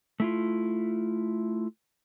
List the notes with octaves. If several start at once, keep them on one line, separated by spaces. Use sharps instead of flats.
A3 E4 F4